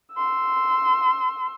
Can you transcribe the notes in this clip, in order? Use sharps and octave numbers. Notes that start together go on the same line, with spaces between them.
C6 E6